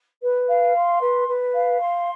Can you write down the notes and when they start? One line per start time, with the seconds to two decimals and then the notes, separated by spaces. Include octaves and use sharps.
0.22 B4
0.48 F5
0.75 C6
1.01 B4
1.27 B4
1.54 F5
1.80 C6